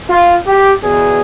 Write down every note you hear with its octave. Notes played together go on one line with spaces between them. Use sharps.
F4
G4
E2 B2 G#4